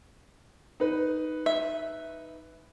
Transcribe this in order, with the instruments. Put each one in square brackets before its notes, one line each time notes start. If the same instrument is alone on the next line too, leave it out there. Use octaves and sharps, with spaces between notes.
[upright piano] D#4 B4
[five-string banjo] E5